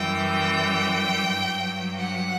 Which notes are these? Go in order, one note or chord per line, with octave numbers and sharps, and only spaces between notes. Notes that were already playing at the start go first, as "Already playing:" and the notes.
Already playing: F#2 E3 G3 G5
G2 F#3
F#5